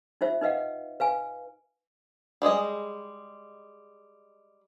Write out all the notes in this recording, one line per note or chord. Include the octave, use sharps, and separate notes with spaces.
D#4 F4 C5 E5
D#4 B4 D#5 F5 F#5
B4 F5 G#5
G3 G#3 G#4 D#5